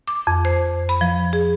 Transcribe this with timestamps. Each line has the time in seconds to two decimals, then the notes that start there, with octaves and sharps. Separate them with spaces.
0.08 D6
0.27 F2
0.45 C5
0.89 B5
1.01 F3
1.33 G#4